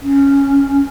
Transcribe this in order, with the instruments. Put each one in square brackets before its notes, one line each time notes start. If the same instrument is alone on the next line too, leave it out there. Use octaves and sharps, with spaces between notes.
[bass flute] C#4